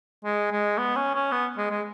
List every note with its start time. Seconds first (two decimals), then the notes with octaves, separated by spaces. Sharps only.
0.24 G#3
0.52 G#3
0.78 B3
0.96 C#4
1.14 C#4
1.32 B3
1.57 G#3
1.71 G#3